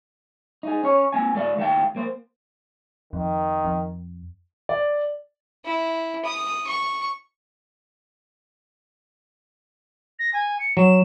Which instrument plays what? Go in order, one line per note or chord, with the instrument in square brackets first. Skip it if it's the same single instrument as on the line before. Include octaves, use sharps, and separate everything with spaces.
[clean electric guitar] D#4 G#4
C#4 C#5
A#3 C4 G#5
A3 A4 D5 F5
D#2 A3 F5 G5
A#3 C5
[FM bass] F2 [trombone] D#3
[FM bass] F2
[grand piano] D5
[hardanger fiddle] E4
D#6
C#6
[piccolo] A#6
G#5
C#7
[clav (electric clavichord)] F#3 [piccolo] E7